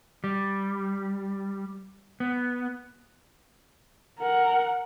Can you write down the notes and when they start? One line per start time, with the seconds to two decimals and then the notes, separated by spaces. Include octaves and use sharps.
0.24 G3
2.20 B3
4.19 A#4 F#5